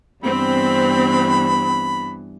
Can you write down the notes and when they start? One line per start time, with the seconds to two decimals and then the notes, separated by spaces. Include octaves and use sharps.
0.24 G2 E3 B3 C4 B5